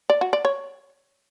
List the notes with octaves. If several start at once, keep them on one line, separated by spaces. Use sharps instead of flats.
D5
F#4
D5
C#5